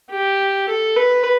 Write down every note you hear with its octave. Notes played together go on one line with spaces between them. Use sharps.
G4
A4
B4